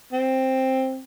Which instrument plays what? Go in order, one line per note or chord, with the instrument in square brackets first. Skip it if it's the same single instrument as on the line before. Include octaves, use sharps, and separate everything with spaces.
[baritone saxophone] C4